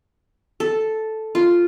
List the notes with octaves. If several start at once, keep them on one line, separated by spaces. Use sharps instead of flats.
A4
F4